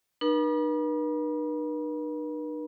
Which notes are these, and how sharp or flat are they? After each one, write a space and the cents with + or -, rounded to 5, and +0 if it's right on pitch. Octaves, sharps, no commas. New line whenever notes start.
D#4 -45 B4 -45 B5 -45